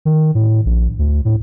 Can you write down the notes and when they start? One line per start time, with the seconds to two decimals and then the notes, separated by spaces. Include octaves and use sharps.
0.05 D#3
0.35 A2
0.66 A#1
0.99 D2
1.25 A2